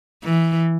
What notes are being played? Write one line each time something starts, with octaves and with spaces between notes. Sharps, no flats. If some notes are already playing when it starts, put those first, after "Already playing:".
E3